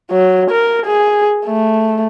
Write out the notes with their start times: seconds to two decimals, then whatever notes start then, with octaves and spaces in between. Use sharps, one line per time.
0.11 F#3
0.51 A#4
0.86 G#4
1.46 A3